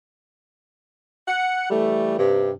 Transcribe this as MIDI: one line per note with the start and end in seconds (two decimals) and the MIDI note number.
1.28 1.67 78
1.70 2.14 52
1.70 2.14 55
1.70 2.14 57
2.18 2.51 43
2.18 2.51 48